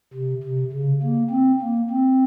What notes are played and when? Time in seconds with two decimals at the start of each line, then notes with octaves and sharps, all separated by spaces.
0.14 C3
0.44 C3
0.73 C#3
1.02 A#3
1.31 C4
1.61 A#3
1.90 C4